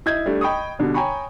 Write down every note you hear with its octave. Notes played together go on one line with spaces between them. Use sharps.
E4 D#5 G6 G#6
G3 A3 D4
D#5 G5 B5 C#6 D#6
B2 D3 G3
C#5 G5 G#5 A#5 B5 C#6